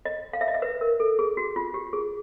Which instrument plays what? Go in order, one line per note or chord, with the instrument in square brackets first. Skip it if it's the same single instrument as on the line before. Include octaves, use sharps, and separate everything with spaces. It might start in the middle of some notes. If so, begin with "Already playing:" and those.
[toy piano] D#5
F5
E5
D#5
E5
B4
A#4
A4
G#4
F#4
F4
G4
G#4